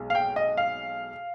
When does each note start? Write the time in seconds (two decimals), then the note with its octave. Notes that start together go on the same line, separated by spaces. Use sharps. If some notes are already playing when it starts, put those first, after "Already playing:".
Already playing: B1 B2 G#3
0.10 F5
0.15 G5
0.36 D#5
0.57 F5